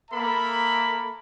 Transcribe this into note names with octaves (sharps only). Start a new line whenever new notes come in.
A#3 A4 E5 A#5 B5